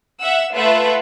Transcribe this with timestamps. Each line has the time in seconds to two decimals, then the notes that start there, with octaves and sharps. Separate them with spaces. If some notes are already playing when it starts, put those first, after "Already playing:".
0.20 E5 F#5 E6
0.54 A3 F4 A4 B4 E5 F#5